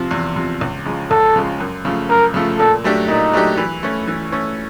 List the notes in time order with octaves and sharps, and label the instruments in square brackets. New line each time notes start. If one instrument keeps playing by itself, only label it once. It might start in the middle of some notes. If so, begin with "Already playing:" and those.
Already playing: [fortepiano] C3 F3
E2
C3 F3
C#2
C#3 F3 G#3
[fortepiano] C#2 [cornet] A4
[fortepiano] C#3 F3 G#3
F#2
C#3 F3 A3
[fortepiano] F#2 [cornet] A#4
[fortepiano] C#3 F3 A3
[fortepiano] A#2 [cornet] A4
[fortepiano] F#3 A3 D4 G4
[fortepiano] A#2 [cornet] D#4
[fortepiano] F#3 A3 D4 G4
E3
A3 C#4
E3
A3 C#4